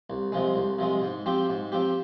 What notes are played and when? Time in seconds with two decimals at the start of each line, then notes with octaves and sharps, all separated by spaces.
0.10 C2
0.32 C3 F3 G#3
0.56 C2
0.79 C3 F3 G#3
1.02 G#2
1.26 F3 C4 G4
1.49 G#2
1.72 F3 C4 G4